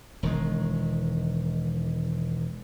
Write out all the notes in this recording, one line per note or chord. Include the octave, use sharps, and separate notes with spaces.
E1 D#3 G#3